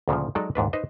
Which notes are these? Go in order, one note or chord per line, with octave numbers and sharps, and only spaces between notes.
D2 A#2 C#3 F3
F#3 G#3 D#4 A4 D5
D#2 G#2 D4 B4
D#4 B4 C5 D#5